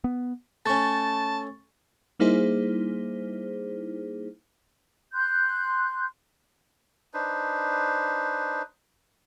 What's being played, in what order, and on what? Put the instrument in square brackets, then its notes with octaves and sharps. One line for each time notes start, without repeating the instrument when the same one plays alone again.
[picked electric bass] B3
[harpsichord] A3 C#4 [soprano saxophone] A5 [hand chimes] C#6 A6
[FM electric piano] G3 A#3 D#4 E4 G#4 C5
[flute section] C6 F#6 G6
[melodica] D4 D#4 B4 C5